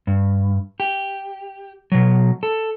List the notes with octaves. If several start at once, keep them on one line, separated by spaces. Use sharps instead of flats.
G2
G4
B2 F#3
A4